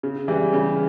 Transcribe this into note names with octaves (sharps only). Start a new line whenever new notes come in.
C#3
E3 G3
C#3